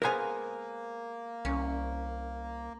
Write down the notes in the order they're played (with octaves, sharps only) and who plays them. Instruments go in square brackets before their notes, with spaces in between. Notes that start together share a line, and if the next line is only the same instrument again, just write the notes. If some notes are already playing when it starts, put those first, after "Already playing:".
[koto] G#3 B3 F5 [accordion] A#3 [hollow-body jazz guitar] A#4 C5 G#5
[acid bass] C2 [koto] C#4